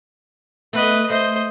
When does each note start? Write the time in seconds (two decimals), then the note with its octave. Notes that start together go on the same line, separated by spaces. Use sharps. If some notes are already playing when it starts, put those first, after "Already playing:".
0.73 A3 B3 B4 D#5
1.10 A3 C5 D#5